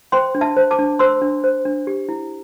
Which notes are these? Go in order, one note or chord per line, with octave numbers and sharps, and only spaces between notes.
C5 G5 C6
D4
E5 A5
C5
A5 D6
D4
C5 C6 E6
D4
C5
D4
G4
E4